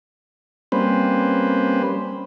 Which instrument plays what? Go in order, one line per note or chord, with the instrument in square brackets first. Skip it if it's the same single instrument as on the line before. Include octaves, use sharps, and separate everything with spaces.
[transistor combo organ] G3 A#3 C4 C#4 B4 C5